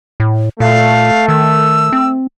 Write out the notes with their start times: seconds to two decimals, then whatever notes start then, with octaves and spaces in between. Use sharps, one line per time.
0.20 A2
0.60 A#2 A3 F5
1.28 D#3 E6
1.93 C4